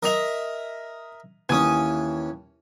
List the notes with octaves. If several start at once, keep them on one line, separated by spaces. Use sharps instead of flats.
A#4 D#5 E5 D#6 F7
D#2 E3 C#4 G#5 D#6